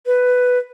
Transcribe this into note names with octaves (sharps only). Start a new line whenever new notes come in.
B4